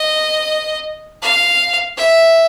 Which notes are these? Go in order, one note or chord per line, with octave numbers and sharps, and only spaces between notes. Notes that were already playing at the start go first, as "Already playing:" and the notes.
Already playing: D#5
F5
E5